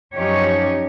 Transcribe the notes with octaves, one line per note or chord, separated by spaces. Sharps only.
F#2 F3 C#4 D#4 G4 C#5